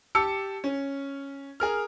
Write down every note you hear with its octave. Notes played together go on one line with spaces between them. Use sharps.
G4 A5 E6 C#7
C#4
G#4 A#4 F6